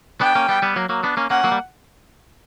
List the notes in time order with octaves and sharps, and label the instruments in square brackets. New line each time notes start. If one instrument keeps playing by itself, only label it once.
[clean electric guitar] B3 D4 [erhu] G5
[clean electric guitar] A#3 C#4
G3 B3
G3 B3
F#3 A#3
F#3 A#3
B3 D4
A#3 C#4
[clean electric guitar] A#3 C#4 [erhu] F#5
[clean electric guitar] F#3 A#3
G3